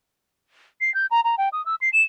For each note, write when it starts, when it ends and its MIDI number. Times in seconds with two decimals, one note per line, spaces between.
0.81 0.93 96
0.94 1.06 91
1.11 1.21 82
1.24 1.36 82
1.38 1.49 79
1.53 1.64 87
1.66 1.75 88
1.81 1.89 96
1.93 2.01 100